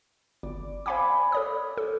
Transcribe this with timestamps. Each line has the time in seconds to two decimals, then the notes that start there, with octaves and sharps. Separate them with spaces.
0.43 G1 D5
0.86 C5 F5 G#5 B5 C6 D6
1.32 A4 C#5 D#6
1.78 A4